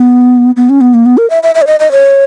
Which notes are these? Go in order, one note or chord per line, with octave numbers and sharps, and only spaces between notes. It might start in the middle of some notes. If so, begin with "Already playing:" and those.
Already playing: B3
B3
C#4
B3
A#3
B3
A#4
E5
E5
E5
C#5
D#5
D#5
C#5